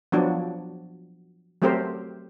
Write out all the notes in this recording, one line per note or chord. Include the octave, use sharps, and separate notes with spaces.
F3 F#3 B3 D4 F#4
F#3 A3 C4 G4 A#4 C5